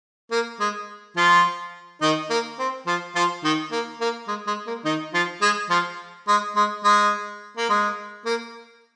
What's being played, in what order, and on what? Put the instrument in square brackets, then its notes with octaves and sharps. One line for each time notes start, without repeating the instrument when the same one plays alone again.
[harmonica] A#3
G#3
F3 F4
D#3 D#4
A#3
C4
F3 F4
F3 F4
D#3 D#4
A#3
A#3
G#3
G#3
A#3
D#3 D#4
F3 F4
G#3 G#4
F3 F4
G#3
G#3
G#3
A#3
G#3
A#3